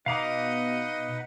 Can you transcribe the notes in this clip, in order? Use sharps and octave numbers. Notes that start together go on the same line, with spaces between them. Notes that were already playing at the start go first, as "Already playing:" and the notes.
B2 D#4 B4 D#5 F5 F#5 A#5 D6